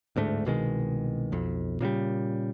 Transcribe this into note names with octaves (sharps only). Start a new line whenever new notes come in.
D1 D2 G#2 A3
C2 B2 D#3 G#3
B1 F2
A#2 C#3 F#3 G3